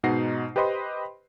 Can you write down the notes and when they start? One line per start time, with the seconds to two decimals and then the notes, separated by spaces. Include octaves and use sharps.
0.03 G#2 B2 D#4 F#5 A#6 C7
0.56 G4 B4 C5 D#5 B5 C6